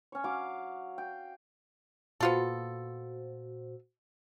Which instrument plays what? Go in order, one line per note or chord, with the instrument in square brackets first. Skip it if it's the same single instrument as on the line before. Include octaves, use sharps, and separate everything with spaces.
[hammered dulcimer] C#4 C#5
F#3 F5 D6
G5
[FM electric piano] A#2 F#4 C5 [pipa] B3 F4 A4